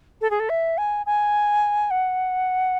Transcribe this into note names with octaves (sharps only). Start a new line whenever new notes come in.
A4
G#4
A4
E5
G#5
G#5
F#5